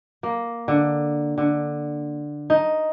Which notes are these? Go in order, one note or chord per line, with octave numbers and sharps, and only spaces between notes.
A#3
D3
D3
D#4